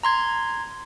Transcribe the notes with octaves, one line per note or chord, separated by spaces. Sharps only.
A#5 C6 G#6